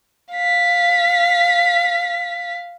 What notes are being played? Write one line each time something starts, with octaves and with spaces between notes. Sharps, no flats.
F5 B6